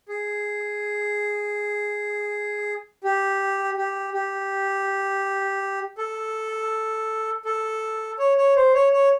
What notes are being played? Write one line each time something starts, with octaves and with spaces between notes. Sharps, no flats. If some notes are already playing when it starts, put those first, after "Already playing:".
G#4
G4
G4
G4
A4
A4
C#5
C#5
C5
C#5
C#5